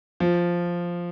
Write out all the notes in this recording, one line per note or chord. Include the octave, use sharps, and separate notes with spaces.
F3